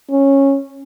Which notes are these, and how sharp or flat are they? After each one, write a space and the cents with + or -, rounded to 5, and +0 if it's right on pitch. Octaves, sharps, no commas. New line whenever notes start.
C#4 -15